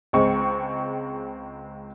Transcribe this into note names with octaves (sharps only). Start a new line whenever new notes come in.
C#2 G#3 C4 C#6